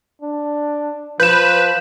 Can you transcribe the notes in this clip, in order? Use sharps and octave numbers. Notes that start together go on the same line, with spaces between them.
D4
F3 B4 G6 E7